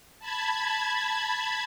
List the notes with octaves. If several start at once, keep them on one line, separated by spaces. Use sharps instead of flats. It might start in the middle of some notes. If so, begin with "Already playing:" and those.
A5 B5 G#6